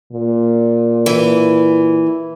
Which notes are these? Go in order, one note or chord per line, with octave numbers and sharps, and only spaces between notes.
A#2
E3